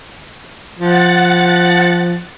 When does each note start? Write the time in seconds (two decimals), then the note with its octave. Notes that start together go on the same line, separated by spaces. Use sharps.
0.79 F3 F#5 A6